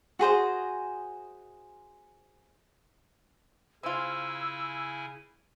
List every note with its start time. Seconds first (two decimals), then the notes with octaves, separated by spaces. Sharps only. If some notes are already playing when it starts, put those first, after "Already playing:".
0.19 F#4 G#4 C5 D#5
3.83 C#3 C4 E4 F4 G#5 E6